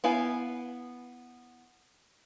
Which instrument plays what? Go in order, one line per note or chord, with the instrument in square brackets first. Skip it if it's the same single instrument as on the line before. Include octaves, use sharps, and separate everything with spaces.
[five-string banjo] B3 E4 F5 G#5